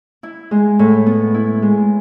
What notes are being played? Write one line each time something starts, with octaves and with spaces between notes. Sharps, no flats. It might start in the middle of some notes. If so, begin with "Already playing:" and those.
E4
G#3
A2
B3
E4
G#3